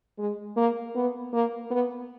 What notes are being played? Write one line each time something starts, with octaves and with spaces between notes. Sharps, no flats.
G#3
A#3
B3
A#3
B3